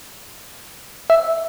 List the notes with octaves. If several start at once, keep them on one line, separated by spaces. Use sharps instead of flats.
E5